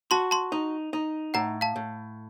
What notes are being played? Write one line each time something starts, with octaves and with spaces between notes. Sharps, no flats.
F#4 A5 C6
A5 C6
D#4
D#4
A2 F#5 A#5
F5 A5
A2